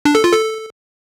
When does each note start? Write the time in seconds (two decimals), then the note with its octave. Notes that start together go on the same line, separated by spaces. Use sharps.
0.05 D4
0.15 A4
0.24 F4
0.33 A4